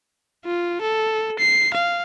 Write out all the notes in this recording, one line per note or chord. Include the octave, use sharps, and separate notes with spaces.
F4
A4
C7
F5